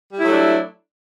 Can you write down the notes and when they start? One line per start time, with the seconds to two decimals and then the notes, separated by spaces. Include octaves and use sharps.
0.13 G3
0.17 E4
0.22 F#3
0.27 A3
0.32 D4